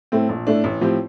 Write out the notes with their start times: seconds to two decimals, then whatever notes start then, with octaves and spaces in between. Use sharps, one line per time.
0.12 A2 A3 C4
0.29 A#1
0.47 A2 A3 D4
0.64 A1
0.81 A2 F3 C4 G4